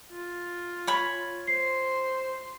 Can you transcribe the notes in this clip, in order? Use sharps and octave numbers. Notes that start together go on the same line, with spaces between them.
F4
C#5 G#5 B5
C5 C6 C7